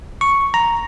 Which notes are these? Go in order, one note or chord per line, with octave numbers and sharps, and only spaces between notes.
C#6
A#5